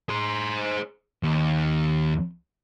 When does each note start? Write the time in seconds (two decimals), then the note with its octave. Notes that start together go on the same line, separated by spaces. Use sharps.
0.09 G#4 C5
1.23 D#2